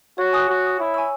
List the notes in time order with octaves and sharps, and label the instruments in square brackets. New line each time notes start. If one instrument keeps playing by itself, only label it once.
[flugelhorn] F#4 [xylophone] C#5
[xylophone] G#5 D#6 F#6
[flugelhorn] F#4 [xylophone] C#5
[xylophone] G#5 D#6
[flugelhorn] E4 [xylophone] C#5
[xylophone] G#5 C#6 E6